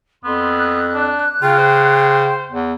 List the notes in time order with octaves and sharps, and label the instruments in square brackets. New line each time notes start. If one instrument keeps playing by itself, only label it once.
[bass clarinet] F2 [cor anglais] B3 [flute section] C6
[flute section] F#6
[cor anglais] D4
[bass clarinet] C#3 [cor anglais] F4 [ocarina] G5
[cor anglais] C5
[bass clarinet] E2